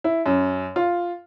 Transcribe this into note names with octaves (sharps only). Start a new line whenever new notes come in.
E4
F#2
F4